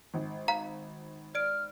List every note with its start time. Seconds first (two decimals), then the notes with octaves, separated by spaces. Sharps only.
0.14 G#1
0.48 F5 A#5
1.35 D5 F6 D7